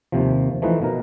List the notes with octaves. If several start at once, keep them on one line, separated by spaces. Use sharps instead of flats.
D#2 C3 F3
E3 F3 A3 D#4 B4
B2 A#4